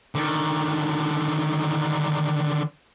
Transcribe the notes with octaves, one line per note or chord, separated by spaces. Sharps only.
D3 D#3